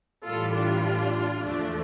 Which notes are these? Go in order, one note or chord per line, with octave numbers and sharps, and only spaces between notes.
A2 E3 G3 F4 A4
D4 F4
E2 D3 F3 A3 D4